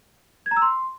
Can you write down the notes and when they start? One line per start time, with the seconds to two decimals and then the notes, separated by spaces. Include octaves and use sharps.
0.46 G#6
0.51 A#5
0.57 E6
0.62 C6